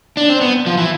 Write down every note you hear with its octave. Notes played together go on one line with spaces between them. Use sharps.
D4
C4
B3
F3
E3